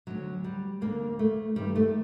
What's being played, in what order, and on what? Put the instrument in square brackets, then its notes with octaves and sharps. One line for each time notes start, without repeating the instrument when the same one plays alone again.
[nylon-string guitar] D2 D3 F#3
G3
D2 D3 A#3
A3
G2 D#3 G3
A3